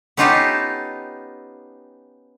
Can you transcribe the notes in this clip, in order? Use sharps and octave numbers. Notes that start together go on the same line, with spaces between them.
B3 C#4 D#4 F4 G4 A4